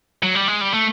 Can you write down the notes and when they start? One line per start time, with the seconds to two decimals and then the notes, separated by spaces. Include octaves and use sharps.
0.23 F#3
0.35 G3
0.48 G#3
0.61 G3
0.74 A3